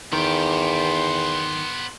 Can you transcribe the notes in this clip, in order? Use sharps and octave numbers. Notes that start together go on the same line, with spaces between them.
E2 D#3 B3 G4 C6